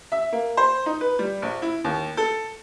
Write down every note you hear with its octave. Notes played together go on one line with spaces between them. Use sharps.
E5
A#3
C5
D#4
B4
G3
A#1
E4
D#2
A4